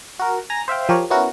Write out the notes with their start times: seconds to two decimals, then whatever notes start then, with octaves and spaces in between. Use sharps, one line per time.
0.19 F#4 A#4
0.50 G#5 A#5 A#6
0.68 C5 E5 F5 G5
0.89 F3 G4 A#4 C#5
1.10 B3 C#4 E4 F#4 A#4